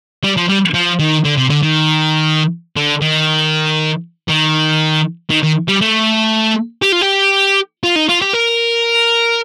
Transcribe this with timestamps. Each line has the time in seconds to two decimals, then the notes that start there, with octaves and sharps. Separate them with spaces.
0.23 G3
0.37 F3
0.49 G3
0.74 F3
0.99 D#3
1.25 D3
1.37 C3
1.50 D3
1.63 D#3
2.76 D3
3.02 D#3
4.29 D#3
5.30 D#3
5.43 D#3
5.68 G3
5.81 A3
6.82 G4
6.92 F4
7.01 G4
7.84 F4
7.96 D#4
8.09 F4
8.22 G4
8.34 A#4